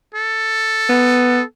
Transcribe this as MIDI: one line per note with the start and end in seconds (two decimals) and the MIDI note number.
0.15 1.44 69
0.89 1.40 59